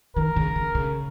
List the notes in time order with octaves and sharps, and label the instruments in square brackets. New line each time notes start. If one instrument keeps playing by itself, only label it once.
[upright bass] D#3 [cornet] A#4
[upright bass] C#3
C#3
C#3